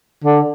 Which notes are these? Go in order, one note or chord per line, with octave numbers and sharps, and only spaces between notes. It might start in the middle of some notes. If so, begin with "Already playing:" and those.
D3